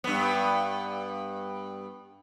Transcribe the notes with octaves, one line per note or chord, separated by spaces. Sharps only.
G2 B3